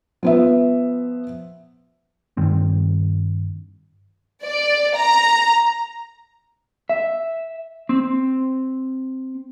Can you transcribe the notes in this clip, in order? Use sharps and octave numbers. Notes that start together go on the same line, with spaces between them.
F3 B3 E5
G2 D#3 C4
D5
A#5
E5
C4